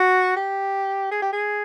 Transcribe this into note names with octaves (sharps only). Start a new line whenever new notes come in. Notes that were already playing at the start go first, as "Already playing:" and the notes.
Already playing: F#4
G4
G#4
G4
G#4